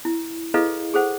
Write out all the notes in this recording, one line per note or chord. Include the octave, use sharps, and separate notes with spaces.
E4
E4 G#4 A4 B4 D#5 F5
G#4 A4 C5 F#5